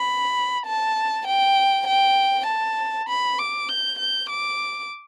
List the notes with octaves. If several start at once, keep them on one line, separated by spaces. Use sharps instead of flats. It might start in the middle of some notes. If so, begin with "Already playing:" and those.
Already playing: B5
A5
G5
G5
A5
B5
D6
G6
G6
D6